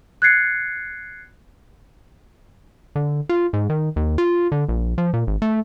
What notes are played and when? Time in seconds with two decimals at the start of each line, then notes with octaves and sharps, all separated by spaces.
0.22 F#6 G#6 A6 C7 C#7
2.96 D3
3.29 F4
3.53 G#2
3.70 D#3
3.96 D#2
4.18 F4
4.52 D3
4.69 A#1
4.98 F3
5.14 A#2
5.27 G#1
5.42 A3